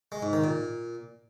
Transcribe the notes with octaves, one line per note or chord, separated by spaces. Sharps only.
G#3
G#2
D#3
A#2